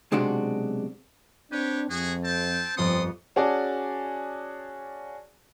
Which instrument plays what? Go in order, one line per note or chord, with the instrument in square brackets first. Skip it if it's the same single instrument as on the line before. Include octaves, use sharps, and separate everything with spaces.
[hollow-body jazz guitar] B1 C3 G#3 D4 F#4
[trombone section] C4 D4 [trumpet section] G4 B4 C#5 [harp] D#7
[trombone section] F2 [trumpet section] F#4 G#4
[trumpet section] C4 G5 A5
[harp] G1 F2 C#7 [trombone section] C4 [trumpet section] D5 C6 D#6
[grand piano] C#4 F#4 G#4 D5 A5